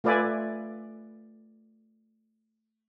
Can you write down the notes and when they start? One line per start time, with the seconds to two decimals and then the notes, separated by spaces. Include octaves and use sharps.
0.04 A3 F4 B4 D5 E5 G#5